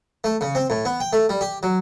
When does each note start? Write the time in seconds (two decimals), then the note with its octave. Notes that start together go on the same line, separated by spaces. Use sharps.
0.24 A3
0.41 C#3
0.55 C4
0.70 A2
0.85 B3
1.00 G5
1.13 A3
1.29 G3
1.41 G4
1.63 F#3